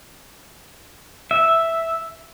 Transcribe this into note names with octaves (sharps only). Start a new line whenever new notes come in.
E5